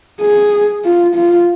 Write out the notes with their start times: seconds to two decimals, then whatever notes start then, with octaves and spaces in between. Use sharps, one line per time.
0.21 G#4
0.84 F4
1.15 F4